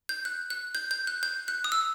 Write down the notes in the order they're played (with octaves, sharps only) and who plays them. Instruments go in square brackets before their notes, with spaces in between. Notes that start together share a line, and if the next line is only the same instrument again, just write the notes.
[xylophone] G6
F#6
F#6
G6
G6
F#6
G6
F#6
D#6
E6